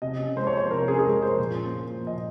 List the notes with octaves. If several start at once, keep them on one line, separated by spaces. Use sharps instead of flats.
C3 D#5
C#4
G#3 C5
C#5
F3 C5
C3 A#4
C#4 G#4
G#4
G#3 A#4
F3 C5
A#2
C#4
A#3
F3
A#2 D#5